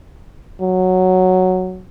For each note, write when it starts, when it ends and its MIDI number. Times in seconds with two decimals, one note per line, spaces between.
0.61 1.82 54